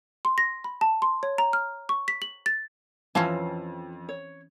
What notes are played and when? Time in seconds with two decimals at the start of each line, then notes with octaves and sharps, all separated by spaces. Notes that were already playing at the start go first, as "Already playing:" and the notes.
0.25 C6
0.38 A#6
0.64 B5
0.81 A5
1.02 C6
1.23 C#5
1.38 A#5
1.53 F6
1.89 C#6
2.08 B6
2.22 F#7
2.46 A6
3.15 F2 E3 C4 C#4 F4 F5 A5
4.09 C#5